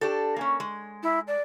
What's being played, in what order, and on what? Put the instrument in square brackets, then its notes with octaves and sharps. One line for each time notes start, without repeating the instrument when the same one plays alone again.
[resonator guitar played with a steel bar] D4 G4 A4
A#3 C#4
G#3
[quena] E4
D5